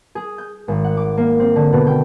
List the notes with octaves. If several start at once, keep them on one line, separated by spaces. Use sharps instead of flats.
G#4
G6
G#1
F#5
D6
A#3
C4
D3
B2
G5